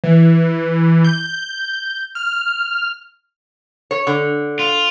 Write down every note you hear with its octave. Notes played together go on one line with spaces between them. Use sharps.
E3
G6
F6
C#5
D3
F4